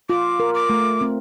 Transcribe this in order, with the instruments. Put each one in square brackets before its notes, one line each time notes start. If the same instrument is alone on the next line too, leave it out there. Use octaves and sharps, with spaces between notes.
[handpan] F4 [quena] D6
[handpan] A#4
[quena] D6
[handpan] A3
C4